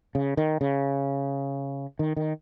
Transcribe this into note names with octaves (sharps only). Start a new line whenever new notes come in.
C#3
D#3
C#3
D#3
D#3